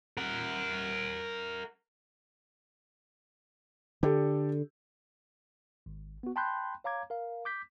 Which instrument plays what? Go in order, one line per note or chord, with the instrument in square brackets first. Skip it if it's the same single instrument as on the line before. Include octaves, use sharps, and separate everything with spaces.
[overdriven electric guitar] A#4 F#5
[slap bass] D3 [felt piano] G4 A4
[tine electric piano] G#1
B3 F#4
G5 A5 B5 C6 F#6 G6
C#5 F5 A#5 D6 G#6
A#4 F5
D6 G6 B6